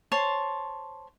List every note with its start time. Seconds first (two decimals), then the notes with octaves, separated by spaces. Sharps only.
0.12 C5 C#5 A5 C6